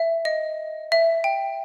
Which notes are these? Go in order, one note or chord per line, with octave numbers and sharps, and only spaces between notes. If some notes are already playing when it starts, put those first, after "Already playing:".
Already playing: E5
D#5
E5
G5